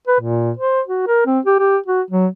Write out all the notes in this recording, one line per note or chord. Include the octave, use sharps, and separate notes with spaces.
B4
A#2
C5
F#4
A#4
C4
G4
G4
F#4
F#3